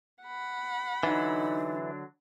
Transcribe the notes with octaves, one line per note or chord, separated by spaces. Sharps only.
F#5 B5
D3 E3 F#3 D4 D#4